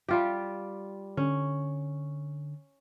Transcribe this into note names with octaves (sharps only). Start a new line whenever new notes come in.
G3 F4 G4
D3 C#4